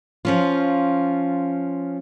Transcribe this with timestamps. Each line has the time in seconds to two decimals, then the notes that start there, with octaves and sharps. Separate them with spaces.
0.25 F3 C#4 F4